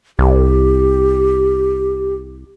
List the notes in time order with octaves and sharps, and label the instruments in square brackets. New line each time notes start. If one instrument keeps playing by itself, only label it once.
[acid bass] C2 [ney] G4